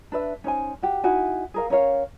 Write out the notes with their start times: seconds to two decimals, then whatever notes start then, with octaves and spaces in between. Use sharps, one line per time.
0.12 D4 B4 E5
0.44 C#4 D#4 C5 G#5
0.82 F#4 G4
1.04 D#4 E4 F#4 G#5
1.54 G#4 A#4 F5
1.70 C#4 A#4 C#5 F5